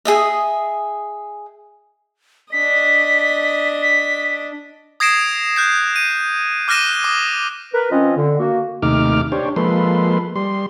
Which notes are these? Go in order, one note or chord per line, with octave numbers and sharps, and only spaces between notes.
G#4 D#5 E5
D4 D#5 B6
B6
D#6 G#6 A#6 C7 D7 E7
F#6 G6 C7
D#7
D6 F6 F#6 A#6 D#7 E7
D6 D#6
A#4 B4
F3 C4 C#4 F4 D#5
D3
A#3 F#4
D#2 C3 A3 D#4 D6 F6
D4 G4 C5 C#5
F3 G#3 A#3 A4 B4 C6
G3 C6